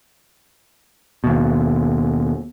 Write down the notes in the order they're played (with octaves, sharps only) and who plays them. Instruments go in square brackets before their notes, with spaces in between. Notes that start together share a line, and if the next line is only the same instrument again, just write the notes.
[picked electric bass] D#2 B2